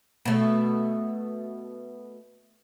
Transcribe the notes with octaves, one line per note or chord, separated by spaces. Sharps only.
B2 A3